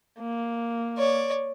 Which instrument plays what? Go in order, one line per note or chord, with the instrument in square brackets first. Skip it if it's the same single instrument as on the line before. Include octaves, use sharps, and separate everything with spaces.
[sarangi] A#3
[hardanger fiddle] C#5 D5